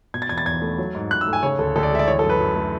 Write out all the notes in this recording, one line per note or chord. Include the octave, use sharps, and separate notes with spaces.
B2 G#6
A6
E2 G#6
A6
E2 G#6
A3
F#3
G#2
G#2 F#6
E6
A3
G#5
C#3 C#5
D2 A4
D2 A4
D5
G#3 E5
D5
E3 C#5
A4
F#2
B4
F#2
A3